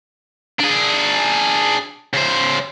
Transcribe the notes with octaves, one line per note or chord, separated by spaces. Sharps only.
D4 G#4
C#3 C5